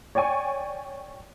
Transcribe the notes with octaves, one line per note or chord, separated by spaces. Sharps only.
C#5 D5 G5 G#5 C#6